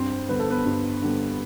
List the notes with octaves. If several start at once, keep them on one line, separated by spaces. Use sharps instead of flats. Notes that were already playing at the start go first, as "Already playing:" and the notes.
Already playing: G2 C4 C5
D3 G3 B3 B4
A4
B3 B4
G2
D3 G3 B3